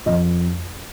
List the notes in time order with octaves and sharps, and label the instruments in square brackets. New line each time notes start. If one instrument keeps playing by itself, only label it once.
[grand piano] F2 D#5